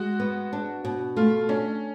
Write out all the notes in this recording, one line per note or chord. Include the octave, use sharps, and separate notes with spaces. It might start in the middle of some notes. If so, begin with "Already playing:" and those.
Already playing: G#3 F#4
B3
D4
B2
A3 F4
C#4 D4